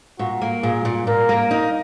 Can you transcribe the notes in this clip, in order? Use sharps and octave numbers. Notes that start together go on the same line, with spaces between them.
A#2 F#4
A#3
A#2 G#4
A#2
A#2 A#4
A#3
D#4